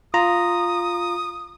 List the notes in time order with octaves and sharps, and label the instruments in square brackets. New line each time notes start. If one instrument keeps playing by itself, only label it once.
[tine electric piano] F4 A#5 [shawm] D#6